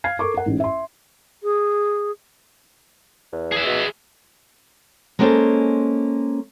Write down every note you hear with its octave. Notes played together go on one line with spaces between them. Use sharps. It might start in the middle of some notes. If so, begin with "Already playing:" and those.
F5 F6 G#6 C7
A4 A#4 C#6 D6
A#4 F#5
A1 G#2
E5 C6
G#4
E2
G#4 E5
B2
G#3 A#3 B3 C#4 A4 C5